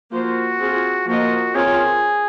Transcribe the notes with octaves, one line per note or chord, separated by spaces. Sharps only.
F3 A#3 F4 F#4 C5
C4 F4 G#4
F3 A#3 F4 F#4 A#4 D#5
C4 F4 G#4 A#4 C#5